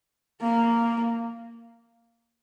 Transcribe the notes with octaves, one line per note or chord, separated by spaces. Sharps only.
A#3